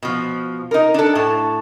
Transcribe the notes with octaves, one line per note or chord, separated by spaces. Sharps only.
B2 F3
D#4 A#4
D4 A4
A2 A5